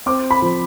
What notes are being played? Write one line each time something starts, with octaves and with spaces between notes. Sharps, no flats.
C4 D6
B5
F3